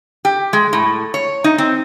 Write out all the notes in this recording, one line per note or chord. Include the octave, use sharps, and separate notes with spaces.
G4
G#3
A2
C#5
D#4
C4